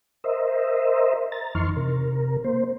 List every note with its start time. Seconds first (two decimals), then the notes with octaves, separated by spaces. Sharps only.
0.24 A#4 C5 D#5 E5
1.32 A#5 A6
1.55 F2 E3 D#4 C6 C#6 F6
1.76 C3 A#4
2.44 A#3 C5